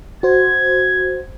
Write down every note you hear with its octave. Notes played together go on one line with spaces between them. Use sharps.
F#4 C5 G#6